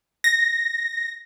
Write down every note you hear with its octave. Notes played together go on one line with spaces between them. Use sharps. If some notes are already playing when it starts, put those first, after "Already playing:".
A#6